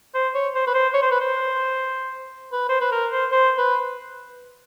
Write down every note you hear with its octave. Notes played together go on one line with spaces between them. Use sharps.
C5
C#5
C5
B4
C5
C#5
C5
B4
C5
B4
C5
B4
A#4
C5
C5
B4